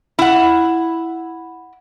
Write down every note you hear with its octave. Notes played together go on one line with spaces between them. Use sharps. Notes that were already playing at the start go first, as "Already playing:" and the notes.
E4 F#5